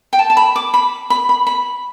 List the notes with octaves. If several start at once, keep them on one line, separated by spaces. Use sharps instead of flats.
G5
A5
A5
B5
D6
B5
B5
B5
B5